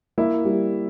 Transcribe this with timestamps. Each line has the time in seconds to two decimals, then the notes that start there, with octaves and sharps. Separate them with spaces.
0.18 A#3 E4
0.45 G3